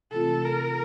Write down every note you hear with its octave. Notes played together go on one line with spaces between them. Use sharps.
C3 E3 A3 C4 F4 A4
A#4